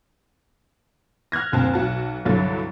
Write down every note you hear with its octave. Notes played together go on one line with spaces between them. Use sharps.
F6 F#6 G#6 A#6
F#1 D2 C4 C5 A5
B1 F#4 A5
C2 G2 D3 F#3 A6